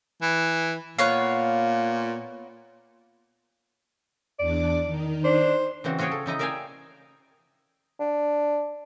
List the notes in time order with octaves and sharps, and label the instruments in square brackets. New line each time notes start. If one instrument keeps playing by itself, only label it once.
[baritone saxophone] E3
[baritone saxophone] A#2 [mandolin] B3 C#5 F5
[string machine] E2 D4 D6 [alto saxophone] D5
[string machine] D#3 D#4
[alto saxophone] D4 [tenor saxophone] C5
[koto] C#3 E3 C4 F#4
F4 F#4 G#4 C#5 F5 G5
A4
C#3 D#4 E4 D#5
A#4 D5 E5 F5 G5 G#5
[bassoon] D4